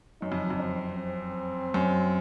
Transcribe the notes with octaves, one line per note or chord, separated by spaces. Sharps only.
F#2 D#4
F2
F2
C4
C4
F#2